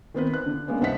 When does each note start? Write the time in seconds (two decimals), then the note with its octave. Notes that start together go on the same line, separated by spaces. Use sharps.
0.14 D#3 B3 C4 B4
0.34 F#6
0.46 D3
0.68 G#3 A#3 B3 C#4
0.81 C2 D4 C5 D#5 F#5 B6